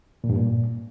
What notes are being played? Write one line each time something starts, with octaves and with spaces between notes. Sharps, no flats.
A#2
G2
A#2